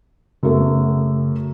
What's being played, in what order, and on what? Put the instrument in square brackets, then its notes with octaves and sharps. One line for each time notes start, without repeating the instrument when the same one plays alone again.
[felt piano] F#2 A3 B3 [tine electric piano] C#3